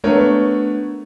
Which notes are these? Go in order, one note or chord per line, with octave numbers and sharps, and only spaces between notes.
A3 B3 D4 A#4 C#5